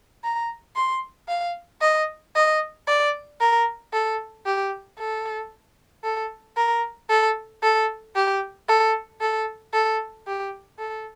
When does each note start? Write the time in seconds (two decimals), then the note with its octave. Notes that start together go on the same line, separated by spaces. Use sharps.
0.24 A#5
0.76 C6
1.28 F5
1.81 D#5
2.35 D#5
2.87 D5
3.40 A#4
3.93 A4
4.46 G4
4.99 A4
6.04 A4
6.57 A#4
7.09 A4
7.63 A4
8.15 G4
8.68 A4
9.21 A4
9.73 A4
10.27 G4
10.79 A4